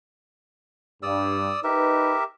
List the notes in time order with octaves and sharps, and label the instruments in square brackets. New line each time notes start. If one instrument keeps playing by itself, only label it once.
[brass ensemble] G2 [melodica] D5 D#6 E6
[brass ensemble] D#4 B4 [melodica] G4 A#4 E5